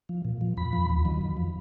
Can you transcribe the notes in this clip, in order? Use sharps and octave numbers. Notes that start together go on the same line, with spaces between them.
F3
A#2
F3
F2 B5
F3
D#2
D#3 F#3
F2
F3